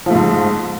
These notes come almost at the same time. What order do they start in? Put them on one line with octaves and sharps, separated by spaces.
F3 A3 G#2